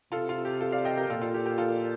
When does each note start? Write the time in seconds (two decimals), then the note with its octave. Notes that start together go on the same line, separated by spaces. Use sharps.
0.12 C3 F4 A4
0.29 F4
0.45 G4
0.61 F4 A4
0.72 D5 F5
0.85 D#5 G5
0.97 G4 A#4
1.09 A#2 F4 A4
1.21 F4 A4
1.34 G4
1.46 G4
1.58 F4 A4